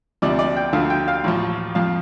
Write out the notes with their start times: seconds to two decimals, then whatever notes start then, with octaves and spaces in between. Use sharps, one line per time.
0.22 D2 C3 F3 D5
0.39 D5
0.57 G5
0.73 D2 D3 F3 F5
0.90 G5
1.08 F5
1.24 A1 A2 F3
1.75 F2 F3 F5